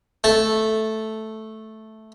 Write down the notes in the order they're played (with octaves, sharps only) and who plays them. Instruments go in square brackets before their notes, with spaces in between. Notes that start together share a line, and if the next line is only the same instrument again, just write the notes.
[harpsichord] A3 A5